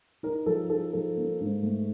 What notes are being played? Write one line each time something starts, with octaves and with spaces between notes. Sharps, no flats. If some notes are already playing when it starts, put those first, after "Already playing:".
D#4 A#4
F3 A4
D#4 A4
F3 A4
A#3
G#2
A3